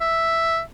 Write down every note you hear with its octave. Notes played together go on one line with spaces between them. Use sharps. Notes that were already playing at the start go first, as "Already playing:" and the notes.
E5